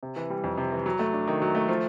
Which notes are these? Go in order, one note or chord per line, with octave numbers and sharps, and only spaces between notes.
C3
E3
G3
F2
C3
E3
F#3
A3
D4
D#3
F#3
A3
F3